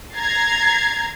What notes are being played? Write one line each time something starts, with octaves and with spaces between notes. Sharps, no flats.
A#5 G#6 A6 C7